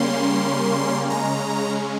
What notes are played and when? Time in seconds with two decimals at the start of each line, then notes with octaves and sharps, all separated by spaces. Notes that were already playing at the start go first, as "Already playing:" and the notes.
Already playing: C#3 G3 A#3 C#4 C6
1.10 C#3 G#3 C#4 A#5